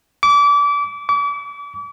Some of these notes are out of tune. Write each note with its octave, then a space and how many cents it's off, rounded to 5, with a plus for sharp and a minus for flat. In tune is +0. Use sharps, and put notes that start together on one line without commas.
D6 -30
D6 -40